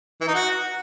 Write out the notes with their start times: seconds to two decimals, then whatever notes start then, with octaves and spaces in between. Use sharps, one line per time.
0.21 E3
0.28 D#4
0.34 F#4